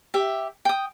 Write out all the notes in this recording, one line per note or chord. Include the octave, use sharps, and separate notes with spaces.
G4 E5
G5 D#6